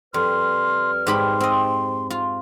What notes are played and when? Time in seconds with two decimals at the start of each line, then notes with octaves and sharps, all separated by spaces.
0.14 F2 G3 B4 C6 F6
1.07 G#2 G4 B5 C6
1.40 C4 D#5
2.10 F4